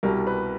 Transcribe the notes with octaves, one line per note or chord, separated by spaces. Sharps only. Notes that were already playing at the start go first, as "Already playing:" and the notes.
C2 B2 G3 A#4
B4